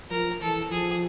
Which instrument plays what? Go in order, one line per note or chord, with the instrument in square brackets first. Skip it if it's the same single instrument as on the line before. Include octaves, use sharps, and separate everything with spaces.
[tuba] F3 [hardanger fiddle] A#4
[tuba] E3 [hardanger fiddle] A4
[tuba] F3 [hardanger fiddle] G#4